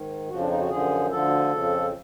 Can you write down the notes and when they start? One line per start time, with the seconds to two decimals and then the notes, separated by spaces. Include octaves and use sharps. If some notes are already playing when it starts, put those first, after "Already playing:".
Already playing: G#2 D#3
0.29 F2 C#3 F3 F#4
0.39 D4
0.50 D#4
0.61 F#4
0.70 F#2 D3 F3 G#4
1.12 D2 D3 F3 A4
1.53 F2 C#3 F3